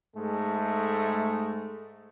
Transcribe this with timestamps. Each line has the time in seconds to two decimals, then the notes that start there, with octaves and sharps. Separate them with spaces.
0.16 G#2 G#3 A3